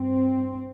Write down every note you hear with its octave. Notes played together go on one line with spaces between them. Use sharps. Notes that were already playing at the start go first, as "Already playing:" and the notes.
Already playing: G2 C4